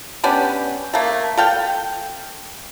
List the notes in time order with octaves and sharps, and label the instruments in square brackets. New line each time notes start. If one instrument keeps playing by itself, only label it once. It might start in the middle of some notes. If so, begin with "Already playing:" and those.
[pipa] B3 C#4 D4 G4
A3 A#3
A4 F5 G5